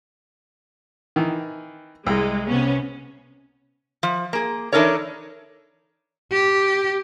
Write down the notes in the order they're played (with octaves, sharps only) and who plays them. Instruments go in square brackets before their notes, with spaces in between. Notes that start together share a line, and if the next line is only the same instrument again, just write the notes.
[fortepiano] D#3 E3
[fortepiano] C2 [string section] G#3
[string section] C3 B3 C#4
[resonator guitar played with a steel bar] F3
A#3 G#4
E3 D4 D#4 A4 A#4 C#5
[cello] G4